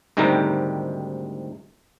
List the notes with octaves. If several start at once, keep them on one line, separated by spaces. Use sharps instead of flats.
D2 G#2 C3 D#3 G3 A#5